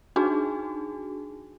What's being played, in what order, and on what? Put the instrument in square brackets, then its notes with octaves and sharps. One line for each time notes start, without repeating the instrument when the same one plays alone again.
[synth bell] D4 D#4 F#4 G#4